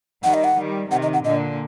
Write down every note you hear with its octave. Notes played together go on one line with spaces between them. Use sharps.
D#3 G3 F#5
D#5
F#5
D#3 G3
C3 D#3 F#5
D#5
F#5
A#2 D3 D#5